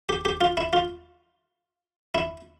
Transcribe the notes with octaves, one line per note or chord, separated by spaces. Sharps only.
G4
G4
F4
E4
F4
E4